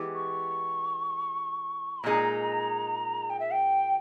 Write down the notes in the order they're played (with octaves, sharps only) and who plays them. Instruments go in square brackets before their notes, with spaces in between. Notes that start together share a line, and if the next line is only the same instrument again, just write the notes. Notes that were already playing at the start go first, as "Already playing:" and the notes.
Already playing: [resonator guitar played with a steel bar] E3 G#3 B3 G4
[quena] C#6
[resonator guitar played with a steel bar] A#2 G#3 D#4 G#4 [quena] A#5
[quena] G5
E5
G5